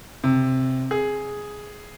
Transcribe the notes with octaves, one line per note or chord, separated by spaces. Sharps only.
C3
G#4